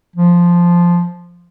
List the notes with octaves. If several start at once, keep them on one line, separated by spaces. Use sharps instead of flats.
F3